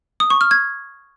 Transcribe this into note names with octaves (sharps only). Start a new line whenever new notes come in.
D#6
C#6
F6
G#6